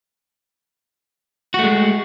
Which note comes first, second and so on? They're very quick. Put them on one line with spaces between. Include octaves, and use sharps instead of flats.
F#4 A3 G#3